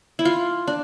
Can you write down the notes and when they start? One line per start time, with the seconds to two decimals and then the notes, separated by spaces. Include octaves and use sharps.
0.19 E4
0.25 F4
0.67 D4